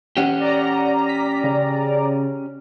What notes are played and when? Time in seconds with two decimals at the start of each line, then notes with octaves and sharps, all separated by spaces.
0.17 C#4 G4 F#5
0.40 D5 A#5
1.09 B6
1.44 C#3